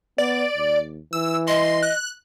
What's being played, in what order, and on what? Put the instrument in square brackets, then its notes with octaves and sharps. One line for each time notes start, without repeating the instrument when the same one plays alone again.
[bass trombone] B3 [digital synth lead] D5
[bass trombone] D#2
[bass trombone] E3 [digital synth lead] E6
[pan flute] D#5 [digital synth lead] C6
[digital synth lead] F#6